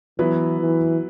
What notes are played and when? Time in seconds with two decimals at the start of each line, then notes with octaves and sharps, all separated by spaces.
0.19 E3 F#3 B3 E4 B4
0.60 E3